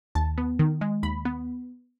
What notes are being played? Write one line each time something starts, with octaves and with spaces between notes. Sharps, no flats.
D#2 A5
B3
D#3
G#3
D#2 B5
B3